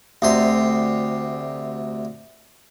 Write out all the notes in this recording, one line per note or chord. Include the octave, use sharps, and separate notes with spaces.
D2 C3 C6